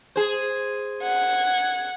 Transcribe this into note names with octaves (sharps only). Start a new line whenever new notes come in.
G#4 C5
F#5 G#6